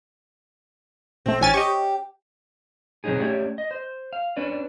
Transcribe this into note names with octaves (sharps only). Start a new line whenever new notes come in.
A#1 A3 C4
A1 C#4 G#5 A6
G4 D#5 C#6
B2 F#3 C4 C#4 D#4 G#4
A3 C#4 G4 C#5 D5
D#5
C5
F5
C#4 D4 B4 D5